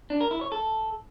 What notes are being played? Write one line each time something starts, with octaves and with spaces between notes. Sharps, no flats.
D4
A#4
E4
C#5
A4